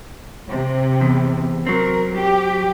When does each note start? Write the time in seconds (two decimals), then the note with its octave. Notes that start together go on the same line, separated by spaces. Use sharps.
0.49 C3
1.01 E2
1.67 F#3 C4 A#4
2.13 G4